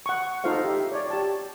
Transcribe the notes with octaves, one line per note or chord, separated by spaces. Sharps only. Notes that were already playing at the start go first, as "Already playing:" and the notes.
F#5 C#6
D#4 F4 A4 C5 F5
G4 E5
C#5 D5
G4 A5